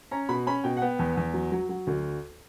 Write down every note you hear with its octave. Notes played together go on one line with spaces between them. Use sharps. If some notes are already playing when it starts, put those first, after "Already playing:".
C#4 A#5
B2 B5
C#4 B5
B2 G5
F#5
B3 G5
E2
E2
F#3
F#3
F#3
D2